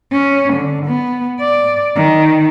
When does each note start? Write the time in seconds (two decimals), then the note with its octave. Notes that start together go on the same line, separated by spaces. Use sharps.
0.13 C#4
0.53 D3
0.86 B3
1.40 D5
1.96 D#3